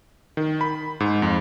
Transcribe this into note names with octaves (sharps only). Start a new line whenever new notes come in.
D#3
B5
G#2
F2